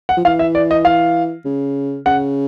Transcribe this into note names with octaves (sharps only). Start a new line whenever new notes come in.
F#5
F3
E3 F5
E5
D5
D#5
F5
C#3
C#3 F#5